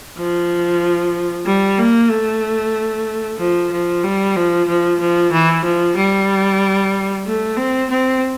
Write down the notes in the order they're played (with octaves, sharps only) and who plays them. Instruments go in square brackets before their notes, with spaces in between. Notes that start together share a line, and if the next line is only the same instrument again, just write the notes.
[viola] F3
G3
A#3
A3
F3
F3
G3
F3
F3
F3
E3
F3
G3
A3
C4
C4